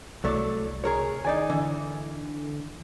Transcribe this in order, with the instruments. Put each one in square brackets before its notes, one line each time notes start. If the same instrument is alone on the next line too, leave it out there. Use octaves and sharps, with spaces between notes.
[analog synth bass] C2 [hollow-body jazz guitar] F#3 A3 D5
[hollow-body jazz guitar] G#4 A#4 C#5
[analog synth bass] D#3 [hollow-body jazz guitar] D#4 D5 G#5
[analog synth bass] D3 [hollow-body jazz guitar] E3